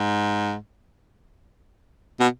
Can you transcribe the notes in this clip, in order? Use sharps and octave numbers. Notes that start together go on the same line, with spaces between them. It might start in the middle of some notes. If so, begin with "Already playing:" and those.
Already playing: G#2
B2